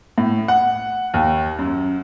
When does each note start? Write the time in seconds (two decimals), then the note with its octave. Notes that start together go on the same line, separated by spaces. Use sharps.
0.18 A2
0.48 F#5
1.14 D#2
1.59 F#2